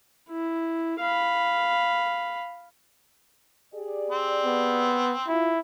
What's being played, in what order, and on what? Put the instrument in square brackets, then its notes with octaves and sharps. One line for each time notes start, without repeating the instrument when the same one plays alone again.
[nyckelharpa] E4
F5 B5
[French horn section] G4 G#4 D5
[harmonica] C4
[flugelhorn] B3
[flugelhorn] E4 [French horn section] F4